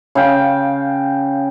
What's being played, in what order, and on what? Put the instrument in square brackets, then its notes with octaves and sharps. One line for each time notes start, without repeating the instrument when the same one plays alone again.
[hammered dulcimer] C#3 F5 G5